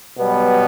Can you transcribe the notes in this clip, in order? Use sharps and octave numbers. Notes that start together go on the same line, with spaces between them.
B2 F#3 G3 B3